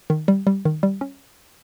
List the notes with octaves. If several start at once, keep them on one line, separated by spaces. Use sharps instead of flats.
D#3
G3
G3
D#3
G3
C#4